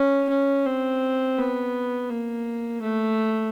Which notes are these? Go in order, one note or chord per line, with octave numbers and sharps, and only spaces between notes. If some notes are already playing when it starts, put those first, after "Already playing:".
Already playing: C#4
C#4
C4
B3
A#3
A3